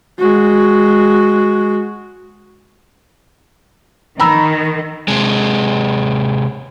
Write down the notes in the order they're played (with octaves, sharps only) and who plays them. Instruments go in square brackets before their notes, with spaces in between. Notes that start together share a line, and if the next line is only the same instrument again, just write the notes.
[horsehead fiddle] G#3 F#4
[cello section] D#3 [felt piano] A#5 B5 E6
[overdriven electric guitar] C3 G#3